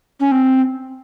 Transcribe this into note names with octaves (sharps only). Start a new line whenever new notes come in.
C#4
C4